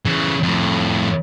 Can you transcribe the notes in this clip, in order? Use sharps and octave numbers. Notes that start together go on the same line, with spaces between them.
C#3 E3
F2 A2